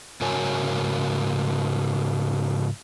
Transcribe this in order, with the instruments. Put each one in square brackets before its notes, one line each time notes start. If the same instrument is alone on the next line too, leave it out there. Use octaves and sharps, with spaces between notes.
[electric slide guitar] G#2 C#3 F#4 A#4 C#5 G#5